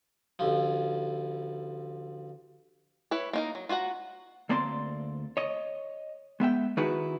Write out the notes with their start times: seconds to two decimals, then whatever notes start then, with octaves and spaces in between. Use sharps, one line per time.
0.39 A1 D2 F3
3.11 E4 B4 C#5
3.33 A#3 D#4 A#4
3.55 F#3
3.69 F4 F#4 C#5 F#5 A#5
4.49 D2 A#3 C4 D5 A#5 C6
5.37 C#5 D#5
6.40 G#3 B3 E5 G5
6.77 D#3 D#4 E4 F#4 G#4 B4